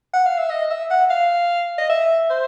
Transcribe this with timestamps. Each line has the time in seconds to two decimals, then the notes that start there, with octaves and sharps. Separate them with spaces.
0.14 F#5
0.26 F5
0.38 E5
0.50 D#5
0.70 E5
0.91 F#5
1.10 F5
1.78 D#5
1.90 E5
2.30 C5